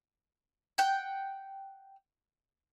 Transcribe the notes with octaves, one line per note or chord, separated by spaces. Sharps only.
F#5 G5